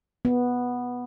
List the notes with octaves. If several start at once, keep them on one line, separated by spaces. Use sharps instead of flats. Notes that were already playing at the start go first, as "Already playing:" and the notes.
B3